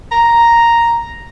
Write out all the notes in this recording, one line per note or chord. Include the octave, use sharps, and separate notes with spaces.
A#5